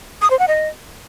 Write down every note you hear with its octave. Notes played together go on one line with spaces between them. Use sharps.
D#6
C5
F#5
D#5